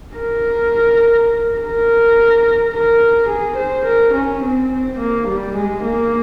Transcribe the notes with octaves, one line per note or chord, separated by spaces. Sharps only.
A#4
A#4
A#4
G#4
C5
A#4
C#4
C4
A#3
G3
G#3
A#3